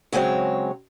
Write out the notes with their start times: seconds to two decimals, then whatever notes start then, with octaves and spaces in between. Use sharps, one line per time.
0.12 C#3 F#3 G#3 C4 C#5